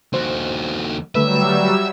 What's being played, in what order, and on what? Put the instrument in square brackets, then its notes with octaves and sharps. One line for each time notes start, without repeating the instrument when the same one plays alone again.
[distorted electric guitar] D#2 F#4 [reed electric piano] C5
[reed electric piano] D3 A3 B4 [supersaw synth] F#3 G3 E6 [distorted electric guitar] E5